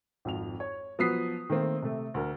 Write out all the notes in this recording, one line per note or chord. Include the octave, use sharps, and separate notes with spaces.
G#1 F2 F7
C#5
F3 F#3 B3 D#6 B6 C7
D#3 A3 A#3 C4
C3 A3
D2 A#4